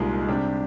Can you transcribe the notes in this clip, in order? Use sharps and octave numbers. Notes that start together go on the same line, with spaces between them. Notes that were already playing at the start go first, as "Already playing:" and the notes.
Already playing: C2 A#2 G#3 D#4 G#4
C3 G3 D4 G4